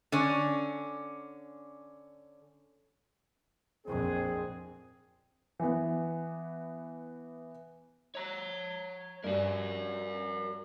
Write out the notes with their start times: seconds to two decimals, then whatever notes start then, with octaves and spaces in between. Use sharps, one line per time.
0.12 D3 C#4
3.86 A#1 F2 C4 G#4
5.59 E3 B3
8.15 C#5 A#5
9.24 G2 F#4 A#4